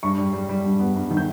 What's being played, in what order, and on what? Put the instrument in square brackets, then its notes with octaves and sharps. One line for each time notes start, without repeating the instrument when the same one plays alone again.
[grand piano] G2 C#6
G3
G3
G3
G2
B3
G2
D#3
G6